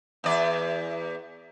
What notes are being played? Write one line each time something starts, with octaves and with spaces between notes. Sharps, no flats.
E2 D5